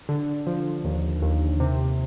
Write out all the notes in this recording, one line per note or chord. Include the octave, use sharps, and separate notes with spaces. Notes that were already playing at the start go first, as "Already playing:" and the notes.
D3
F3
D#2
D#2
C3